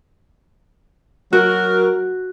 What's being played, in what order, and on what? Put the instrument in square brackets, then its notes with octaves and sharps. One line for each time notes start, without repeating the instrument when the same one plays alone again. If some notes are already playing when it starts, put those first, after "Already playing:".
[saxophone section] F#3 A#4 [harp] F#4